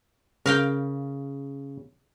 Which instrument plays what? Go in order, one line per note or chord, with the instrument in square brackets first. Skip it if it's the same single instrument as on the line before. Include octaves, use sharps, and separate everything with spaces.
[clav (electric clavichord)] C#3 [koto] A#4 F5 G5